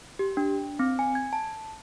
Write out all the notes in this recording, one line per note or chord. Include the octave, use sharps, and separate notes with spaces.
G4
D4
C4
G#5
G#6
A5